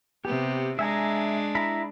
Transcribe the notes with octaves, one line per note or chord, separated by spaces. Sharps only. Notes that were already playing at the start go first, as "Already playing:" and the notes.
C3 B3 G4
G#3 D4 E5 G#5 A#5
E4 A#5 B5